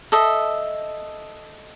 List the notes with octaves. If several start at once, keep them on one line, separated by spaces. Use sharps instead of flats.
A4 D#5 E5